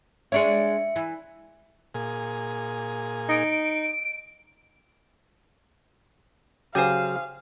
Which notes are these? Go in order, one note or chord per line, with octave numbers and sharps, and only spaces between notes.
G#3 D4 C#5 E5 C#7
E3
A#2 G#4
D#4 D7
C#3 F#3 G4 C5 F5 G#5 D#6